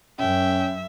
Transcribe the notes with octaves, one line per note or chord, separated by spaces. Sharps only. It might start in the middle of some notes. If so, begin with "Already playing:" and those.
F#2 C#4 E5 G5